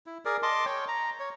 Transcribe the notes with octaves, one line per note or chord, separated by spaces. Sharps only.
E4
G#4 A#4 D5
D#5 A5 C6 D6
C#5 G5
A#5
C#5